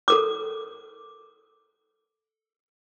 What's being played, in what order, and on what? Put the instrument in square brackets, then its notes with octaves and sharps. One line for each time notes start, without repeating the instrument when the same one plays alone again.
[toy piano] A4 A#4 D6